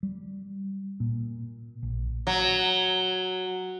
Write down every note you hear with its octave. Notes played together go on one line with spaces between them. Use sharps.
G3
A#2
A#1
F#3